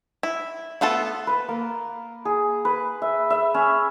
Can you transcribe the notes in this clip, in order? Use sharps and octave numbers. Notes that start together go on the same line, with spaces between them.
E4
A3 B3 F4 A4
B4
A#3
G#4
B4
E5
E5
C#4